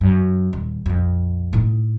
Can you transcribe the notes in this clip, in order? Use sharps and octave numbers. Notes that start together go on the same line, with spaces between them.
F#2
D#1
A#1 F2
A2 D#4